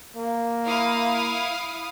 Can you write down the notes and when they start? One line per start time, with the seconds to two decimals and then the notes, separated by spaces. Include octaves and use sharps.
0.16 A#3
0.66 E4 F5 D#6